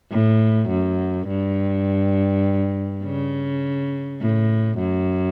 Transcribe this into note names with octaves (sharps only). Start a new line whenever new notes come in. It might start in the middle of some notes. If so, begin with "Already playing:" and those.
A2
F#2
G2
C#3
A2
F#2